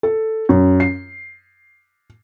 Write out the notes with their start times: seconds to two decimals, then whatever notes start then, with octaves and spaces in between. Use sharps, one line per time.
0.03 A4
0.49 F#2
0.80 C7